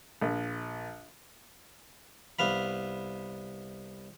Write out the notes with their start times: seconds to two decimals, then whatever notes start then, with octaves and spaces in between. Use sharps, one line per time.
0.21 A#1
2.39 C2 B3 F5 B5